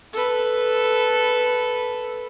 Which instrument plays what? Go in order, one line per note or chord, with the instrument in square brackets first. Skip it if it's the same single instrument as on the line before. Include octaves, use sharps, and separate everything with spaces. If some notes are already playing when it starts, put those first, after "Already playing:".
[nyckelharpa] A4 B4